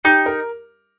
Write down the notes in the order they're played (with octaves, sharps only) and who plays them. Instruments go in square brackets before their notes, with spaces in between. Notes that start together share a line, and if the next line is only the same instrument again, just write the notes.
[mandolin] D#4 [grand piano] G4
[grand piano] A#4